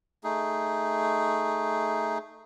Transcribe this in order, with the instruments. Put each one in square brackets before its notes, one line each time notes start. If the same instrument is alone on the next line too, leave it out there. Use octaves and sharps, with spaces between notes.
[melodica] A3 D#4 G#4